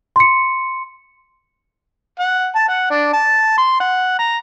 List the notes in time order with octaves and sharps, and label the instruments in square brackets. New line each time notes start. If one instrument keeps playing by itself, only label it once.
[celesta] C6 C#7
[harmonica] F#5
A5
F#5
D4
A5
C6
F#5
A#5